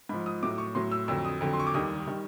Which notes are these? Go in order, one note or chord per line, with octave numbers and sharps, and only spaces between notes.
G#2 F3 B5
D#6
A2 F#3 D6
C#6
A2 F#3 C6
E6
F2 D3 F#3 E6
D#6
F2 D3 F#3
C6
C#6
D6
D#2 D#3 G3 D#6
D#3 G3